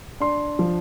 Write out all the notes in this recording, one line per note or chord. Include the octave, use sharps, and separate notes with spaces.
D4 C6
F3